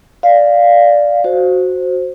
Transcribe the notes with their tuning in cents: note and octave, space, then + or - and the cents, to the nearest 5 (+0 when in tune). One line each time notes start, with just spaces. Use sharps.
D5 +0 F5 +0
F#4 -5 C5 +0